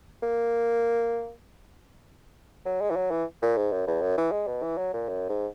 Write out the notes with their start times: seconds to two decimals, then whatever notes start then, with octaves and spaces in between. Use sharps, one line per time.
0.22 A#3
2.65 F#3
2.81 G#3
2.91 E3
2.96 F#3
3.11 E3
3.42 A#2
3.57 G#2
3.72 F#2
3.87 E2
4.02 F#2
4.17 E3
4.32 G#3
4.47 B2
4.63 E3
4.78 F#3
4.93 A#2
5.08 F#2
5.29 G#2